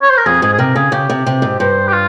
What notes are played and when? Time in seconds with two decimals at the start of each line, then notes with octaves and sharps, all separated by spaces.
0.02 C#5
0.09 C5
0.17 A#4
0.26 F2 G#4
0.42 G#2 G#4
0.53 G#4
0.58 C3 A#4
0.75 C#3 G#4
0.92 C#3 G4
1.09 C3
1.26 C3
1.42 G#2
1.59 G2 C5
1.88 G4
1.93 F4